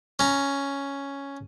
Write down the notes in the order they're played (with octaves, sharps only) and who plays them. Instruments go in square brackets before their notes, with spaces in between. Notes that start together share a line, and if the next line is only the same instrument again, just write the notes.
[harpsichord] C#4 A#5